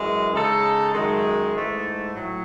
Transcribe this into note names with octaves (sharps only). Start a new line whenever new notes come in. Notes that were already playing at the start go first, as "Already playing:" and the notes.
Already playing: F#2 E3 G#3
C#3 G#3 D#4 A4
F#2 D#3 G#3
G#2 E3 A3
A2 F#3